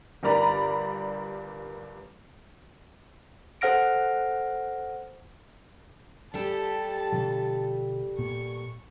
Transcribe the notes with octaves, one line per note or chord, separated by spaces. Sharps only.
G1 G2 A#4 D5 A#5 B5
A4 C5 F#5 F6 A#6 D7
G3 G4 A4 A5
B2 D3 F3
A#2 B3 C#6